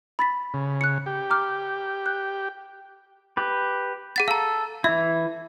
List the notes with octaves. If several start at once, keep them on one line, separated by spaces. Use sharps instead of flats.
B5 A6 B6
C#3
F#6 C#7
G4
A#5 D6 F6
F#6 G6
G4 B4
G#4 F#5 A6
A4 F5 A#5
E3 E4 E5